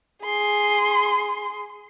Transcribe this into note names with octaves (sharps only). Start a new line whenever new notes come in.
G#4 C6